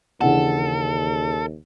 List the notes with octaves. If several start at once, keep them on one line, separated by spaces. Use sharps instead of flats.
D#2 C#3 E3 D4 A4 F#5